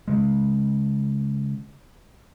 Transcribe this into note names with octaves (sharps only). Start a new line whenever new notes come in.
C#3 G#3